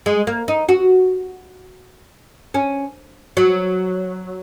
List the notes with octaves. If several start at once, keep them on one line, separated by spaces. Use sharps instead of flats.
G#3
A#3
D#4
F#4
C#4
F#3